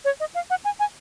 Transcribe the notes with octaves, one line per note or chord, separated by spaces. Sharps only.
C#5
D#5
F5
F#5
G#5
G#5